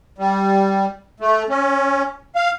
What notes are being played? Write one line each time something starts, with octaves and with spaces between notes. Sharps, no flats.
G3
A3
C#4
F5